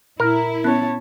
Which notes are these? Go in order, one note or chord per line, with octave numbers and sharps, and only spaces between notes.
A#2 E4 A#4
B3 C#4 C#5 A5 F#6